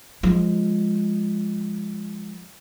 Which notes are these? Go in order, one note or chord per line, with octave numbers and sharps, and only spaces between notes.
F3 G#3